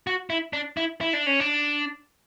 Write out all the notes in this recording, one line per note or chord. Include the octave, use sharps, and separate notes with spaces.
F#4
E4
D4
E4
E4
D4
C#4
D4